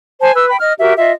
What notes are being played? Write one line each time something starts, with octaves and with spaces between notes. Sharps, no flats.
C5 G#5 A5
B4 E6
G5 B5
D#5 F6
F#4 G4 A#4 E5
F4 D#5 E5